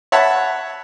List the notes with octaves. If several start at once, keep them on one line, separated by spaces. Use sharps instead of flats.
C#5 E5 F#5 A5 B5